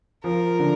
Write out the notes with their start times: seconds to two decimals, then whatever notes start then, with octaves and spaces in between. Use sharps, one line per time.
0.24 F3 A#4
0.59 D3